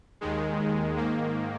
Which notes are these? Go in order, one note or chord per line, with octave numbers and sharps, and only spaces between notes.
D#2 D#3 G#3
G#2 D#3 A#3